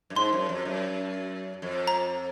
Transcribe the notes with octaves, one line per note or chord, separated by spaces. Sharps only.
F#2
G#2 C6
F#2
F2
F#2
F2
A#5